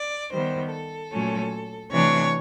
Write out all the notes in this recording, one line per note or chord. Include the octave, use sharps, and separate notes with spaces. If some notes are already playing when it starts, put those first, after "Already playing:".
Already playing: D5
D#3 G3 B3 C5
A4
A#2 F#3 A3 C#4
C3 E3 A3 D4 C#5